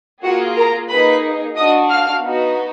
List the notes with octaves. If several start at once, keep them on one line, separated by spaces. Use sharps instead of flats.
A#3 F4 F#4 G#4 F#5
A#4 A#5
A#3 D#4 G#4 B4 B5
D4 F#4 D#5 D#6
F5 F6
B3 D#4 F#4